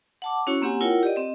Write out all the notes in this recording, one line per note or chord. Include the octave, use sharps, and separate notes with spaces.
F#5 A5 D6
C#4 E4 F#4 C#5
A#3 C4 G4 F#5 G#5
E4 F4 A#4 C#5 F#5 G5
G4 D5 D#5
C4 D#5